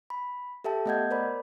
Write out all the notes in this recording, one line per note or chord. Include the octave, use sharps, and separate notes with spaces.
B5
G4 A4 E5 G5 A5
A3 B3 D#5 F#5 G6 G#6
A#4 C5 D5 B5